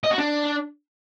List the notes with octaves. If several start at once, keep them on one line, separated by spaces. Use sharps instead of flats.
D#5
F#4
D4